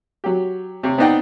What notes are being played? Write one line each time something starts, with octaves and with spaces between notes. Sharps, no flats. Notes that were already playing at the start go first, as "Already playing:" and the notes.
F#3 G4
C3 C#5
B3 C4 D4 D#4 F#5 G5